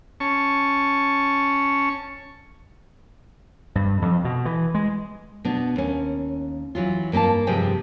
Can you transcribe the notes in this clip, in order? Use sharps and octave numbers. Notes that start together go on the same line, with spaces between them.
C#4 A5 C#6
G2
F2
B2
E3
G#3
B2 B3 D4
D#2 C#4
E3 F#3 F4
G2 A#3 G4 F5 A5
G2 C3 F3 F4 G#4 G5